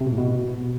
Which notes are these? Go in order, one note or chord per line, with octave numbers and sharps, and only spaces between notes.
C3
B2
A2
B2